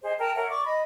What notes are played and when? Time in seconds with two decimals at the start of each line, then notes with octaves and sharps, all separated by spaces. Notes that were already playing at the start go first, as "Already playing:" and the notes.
0.02 G#4 C5 D#5
0.18 A#4 G5 A5 A#5
0.35 A#4 C#5 E5 F#5
0.50 D5 C#6 D6
0.64 D#5 B5